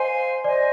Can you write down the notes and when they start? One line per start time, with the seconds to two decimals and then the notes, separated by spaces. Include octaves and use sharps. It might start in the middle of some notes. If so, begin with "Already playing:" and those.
Already playing: C5 D#5 F5 G#5
0.44 C5 D5 D#5 G#5